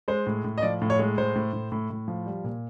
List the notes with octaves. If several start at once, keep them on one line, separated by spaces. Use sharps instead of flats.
G#3 C5
A2
A2
D#5
F3 D5
A2
C#5
G#3
A2 C5
A2
A2
A2
A2
F3
G3
A#2